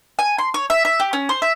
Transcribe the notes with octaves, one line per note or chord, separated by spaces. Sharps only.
G#5
C6
C#5
E5
E5
G4
C#4
C5
E5